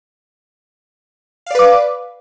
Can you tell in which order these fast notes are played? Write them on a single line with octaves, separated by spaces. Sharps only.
F5 D5 B4 D6